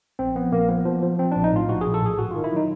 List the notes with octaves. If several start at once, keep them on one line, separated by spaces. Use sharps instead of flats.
A#1 C4
F3 B3
A#1 A#3
F3 B3
F3
F3
F3 C4
A#1 D4
D#4
A2 F4
A#1 F#4
A#1 G#4
A4
A2 G#4
G#1 F#4
D#3 F4
E4
F#3 D#4